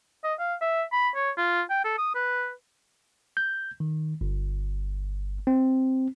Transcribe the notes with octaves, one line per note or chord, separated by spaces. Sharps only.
D#5
F5
E5
B5
C#5
F4
G5
A4
D#6
B4
G6
D#3
G1
C4